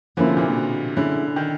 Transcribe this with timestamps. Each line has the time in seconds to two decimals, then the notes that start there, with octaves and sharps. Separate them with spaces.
0.17 D3 F3 A#3 C#4 E4
0.27 C3
0.37 A#2
0.47 B2
0.96 D3 G#3 C#4 E4
1.36 D#3